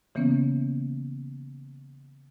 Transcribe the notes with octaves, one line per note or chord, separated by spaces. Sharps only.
C#3 E3 A#3 B3 C#4